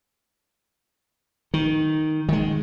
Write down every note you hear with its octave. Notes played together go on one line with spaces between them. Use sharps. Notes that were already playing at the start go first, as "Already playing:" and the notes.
D#3
D#3 G#3